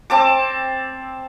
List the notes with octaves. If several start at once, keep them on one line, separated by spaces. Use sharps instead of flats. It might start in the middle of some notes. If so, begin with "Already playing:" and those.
C4 A5 D6